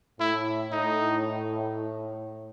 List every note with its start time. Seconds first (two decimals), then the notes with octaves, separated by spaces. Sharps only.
0.20 A2 E4
0.72 A2 D#4